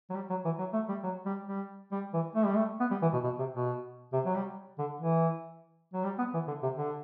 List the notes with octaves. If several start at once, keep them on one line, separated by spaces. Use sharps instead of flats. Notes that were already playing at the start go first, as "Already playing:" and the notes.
F#3
G3
F#3
E3
F#3
A3
G3
F#3
G3
G3
G3
E3
A3
G3
A3
B3
G3
E3
B2
B2
C3
B2
C3
F#3
G3
D3
E3
F#3
G3
B3
E3
D3
C3
D3